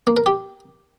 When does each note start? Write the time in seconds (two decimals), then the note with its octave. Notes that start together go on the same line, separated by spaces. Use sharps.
0.07 A#3
0.17 A#4
0.26 G4